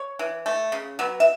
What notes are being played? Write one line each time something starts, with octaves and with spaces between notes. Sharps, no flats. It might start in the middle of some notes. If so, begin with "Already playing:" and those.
Already playing: C#5
E3
A3
C#3
F#3 B3
E5